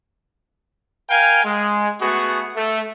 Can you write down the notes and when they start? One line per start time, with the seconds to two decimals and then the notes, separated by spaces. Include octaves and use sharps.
1.10 A#4 F5 G5 G#5
1.44 G#3
2.02 A3 B3 F#4 G#4
2.56 A3